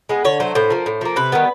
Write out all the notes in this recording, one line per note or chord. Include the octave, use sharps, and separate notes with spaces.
G#3 B3
D3 C#5
F#3 A3 C5
A2 C5
F3 A#3
A2
F3 A#3
C3 B4
D#3 G3 B3